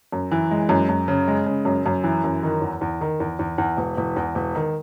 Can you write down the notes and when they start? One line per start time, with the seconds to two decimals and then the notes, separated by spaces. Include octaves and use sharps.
0.12 F#2
0.31 E3
0.51 G#3
0.69 F#2
0.89 F#2
1.08 C#3
1.28 G#3
1.46 C#3
1.65 F#2
1.86 F#2
2.04 E3
2.24 F#2
2.43 D#3
2.62 E2
2.81 E2
3.01 D#3
3.20 E2
3.39 E2
3.58 E2
3.77 E1
3.97 E1
4.16 E2
4.35 E1
4.55 D#3